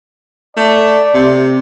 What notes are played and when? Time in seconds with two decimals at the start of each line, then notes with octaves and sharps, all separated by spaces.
0.57 A3 D5
1.14 C3